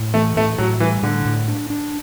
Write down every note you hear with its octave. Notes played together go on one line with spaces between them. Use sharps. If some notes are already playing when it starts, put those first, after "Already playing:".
Already playing: A2
E3 A3
A2 A3
A2 F#3
E3 G3
A2 D3
A2
D4
D4